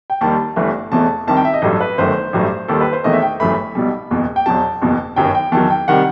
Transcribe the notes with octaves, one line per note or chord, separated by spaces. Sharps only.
G5
D#2 D#3 G3 A5
G1 G2 E3 A3
E1 E2 B2 A3 A5
C2 C3 D#3 G3 A5
G5
E5
D#5
A1 G2 F#3 A4
B4
G1 F#2 D#3 A3 C5
A1 G2 F#3 A3
D#2 D#3 G3 A4
B4
C5
E1 E2 D#3 A3 D#5
E5
G5
G1 F#2 E3 A3 B5
B1 B2 G3
F#1 E2 B2
G5
E1 E2 B2 F#3 A5
F#1 E2 B2
G1 F#2 D#3 F#3 G5
G5
E2 D#3 F#3 A5
G5
C3 D#3 G3 F#5